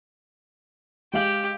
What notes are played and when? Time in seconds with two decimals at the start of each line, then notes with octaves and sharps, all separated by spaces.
1.13 G#3 G4 F5 F#7